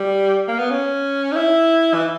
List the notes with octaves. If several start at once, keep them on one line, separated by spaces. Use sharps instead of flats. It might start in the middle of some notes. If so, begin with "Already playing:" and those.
Already playing: G3
A#3
B3
C#4
D#4
E4
E3